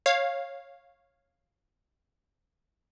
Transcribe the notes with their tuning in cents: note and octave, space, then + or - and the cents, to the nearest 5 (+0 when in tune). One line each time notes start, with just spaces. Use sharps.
C#5 -15 F5 +0